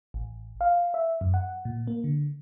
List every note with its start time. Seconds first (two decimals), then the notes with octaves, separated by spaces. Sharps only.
0.14 A1
0.61 F5
0.94 E5
1.21 F#2
1.34 F#5
1.65 A#2
1.87 A#3
2.04 D3